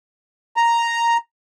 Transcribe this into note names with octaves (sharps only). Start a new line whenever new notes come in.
A#5